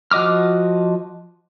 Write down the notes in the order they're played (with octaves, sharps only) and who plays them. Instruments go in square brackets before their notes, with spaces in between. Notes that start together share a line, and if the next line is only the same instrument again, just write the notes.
[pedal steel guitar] F3 F#4 D#5 D6 F6